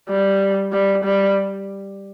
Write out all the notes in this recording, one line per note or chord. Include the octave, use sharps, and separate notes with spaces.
G3
G3
G3